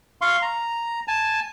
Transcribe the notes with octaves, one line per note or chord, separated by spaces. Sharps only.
F5 C6 C#6
A#5
G#5 A5